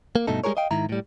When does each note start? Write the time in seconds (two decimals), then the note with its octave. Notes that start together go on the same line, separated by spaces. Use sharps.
0.16 A#3
0.27 G2 B2 A3 D#4 A4
0.44 G3 G#3 F#4 G#4 A#4 C#5
0.57 D#5 F5 G5
0.71 G#2 D#3 E4 A#5
0.89 A2 G3